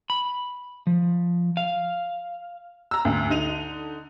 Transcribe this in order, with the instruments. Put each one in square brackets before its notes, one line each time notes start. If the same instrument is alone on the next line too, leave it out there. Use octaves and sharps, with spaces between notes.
[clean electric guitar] B5
F3
F5
[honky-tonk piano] A#5 E6
D2
D3 D#4 D#7 F7